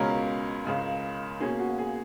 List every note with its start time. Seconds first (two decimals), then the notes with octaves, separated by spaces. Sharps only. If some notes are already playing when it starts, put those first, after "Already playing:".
Already playing: C#2 B2 G#3 C#4 A#4
0.65 C#2 C#3 G#3
1.40 B2 A#3 C#4 G#4
1.60 F#4
1.78 G#4